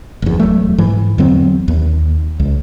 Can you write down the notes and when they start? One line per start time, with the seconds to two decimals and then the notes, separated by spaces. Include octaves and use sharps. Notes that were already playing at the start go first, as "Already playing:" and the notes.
0.22 F#1 E2
0.39 E1 F#3 A3
0.78 G#2 E3
1.18 E2 D3 F#3 C4
1.68 D#2
2.40 C#2